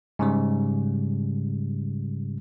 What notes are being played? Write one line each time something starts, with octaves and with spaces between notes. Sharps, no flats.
G#2 C#3 G3